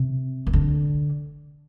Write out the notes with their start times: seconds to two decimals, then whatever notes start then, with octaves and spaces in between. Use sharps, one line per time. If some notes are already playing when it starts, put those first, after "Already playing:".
Already playing: C3
0.47 D#3
0.53 D3